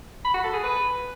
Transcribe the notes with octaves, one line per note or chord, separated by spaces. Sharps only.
B5
F#4
A4
G#4
B4